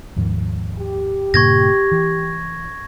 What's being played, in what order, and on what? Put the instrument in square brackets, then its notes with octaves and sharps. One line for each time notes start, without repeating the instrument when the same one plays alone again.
[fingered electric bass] D#2 G#2 F3
[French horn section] G4
[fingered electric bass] G2 A#2 C#3 [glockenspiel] C#6 G#6 A#6
[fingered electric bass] E3